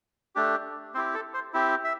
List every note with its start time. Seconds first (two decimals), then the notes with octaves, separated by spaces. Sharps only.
0.36 A3 D4 G4
0.94 C4 E4 G4 C5
1.15 A4
1.34 C5
1.54 C4 E4 G4
1.84 E5